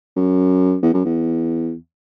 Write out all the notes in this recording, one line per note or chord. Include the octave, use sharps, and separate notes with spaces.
F#2
E2
F#2
E2